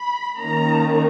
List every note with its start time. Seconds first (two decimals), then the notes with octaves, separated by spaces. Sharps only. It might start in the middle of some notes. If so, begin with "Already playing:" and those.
Already playing: B5
0.38 D#3 A#3 C#4 A#5